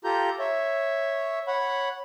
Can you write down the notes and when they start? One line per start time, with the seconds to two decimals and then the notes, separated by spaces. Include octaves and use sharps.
0.04 F4 G4 A4 A#5 G6
0.39 C#5 E5
1.48 C#5 F#5 B5